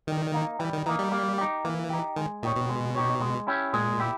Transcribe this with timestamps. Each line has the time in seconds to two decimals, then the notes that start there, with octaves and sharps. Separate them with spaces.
0.07 D#3 G3
0.33 A#3 D#4
0.59 E3 G3
0.73 D#3
0.86 E3 A#3 D#4
0.99 G3
1.12 A#3
1.38 D#4 G4
1.64 E3 A#3
1.90 D#4 G4
2.16 D#3 G#3
2.43 A#2 D#4 G4 C#5
2.56 B2
2.69 G#3
2.95 D#4 G4 C#5
3.21 G#3
3.47 C#4 E4 G4
3.73 A#2 G#3
4.00 E4 G4